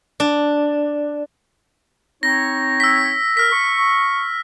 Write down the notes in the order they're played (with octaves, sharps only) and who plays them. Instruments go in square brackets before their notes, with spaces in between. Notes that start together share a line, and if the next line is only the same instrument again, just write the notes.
[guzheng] D4
[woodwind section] C4 D#4 C#5 [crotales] A#6
[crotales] E6 B6
[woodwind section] A#4 [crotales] F6 B6
[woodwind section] C#6